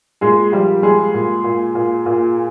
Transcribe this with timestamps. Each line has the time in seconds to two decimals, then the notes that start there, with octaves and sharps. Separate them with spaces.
0.21 A#2 G#3 G#4
0.52 F3 G3 G4
0.83 G3 G#3 G#4
1.14 A#2
1.44 A#2
1.75 A#2
2.06 A#2